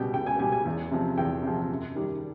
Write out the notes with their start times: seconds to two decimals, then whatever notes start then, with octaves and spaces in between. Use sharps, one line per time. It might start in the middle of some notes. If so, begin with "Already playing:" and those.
Already playing: C#2 B2 G3 G5
0.13 C#2 G5
0.26 G#5
0.39 B2 G3 G#5
0.52 G#5
0.65 E2
0.91 C3 F3
1.18 E2 G5
1.43 C3 F3
1.69 F#2
1.95 D#3 G3